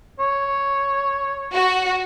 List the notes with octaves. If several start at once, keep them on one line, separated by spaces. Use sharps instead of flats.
C#5
F#4